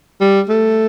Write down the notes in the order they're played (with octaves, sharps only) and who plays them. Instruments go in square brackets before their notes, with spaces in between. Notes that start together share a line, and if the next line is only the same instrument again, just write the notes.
[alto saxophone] G3
A3